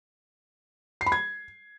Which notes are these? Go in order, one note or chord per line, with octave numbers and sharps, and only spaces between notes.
C7
B5
G#6